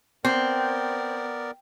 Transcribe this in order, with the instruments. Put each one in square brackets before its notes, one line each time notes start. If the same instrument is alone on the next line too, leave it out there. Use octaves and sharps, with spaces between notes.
[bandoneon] B3 A#4 D5 [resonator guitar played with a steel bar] C4